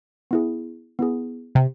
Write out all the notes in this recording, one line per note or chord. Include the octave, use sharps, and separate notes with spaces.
B3 E4 G#4
B3 E4 G#4
C3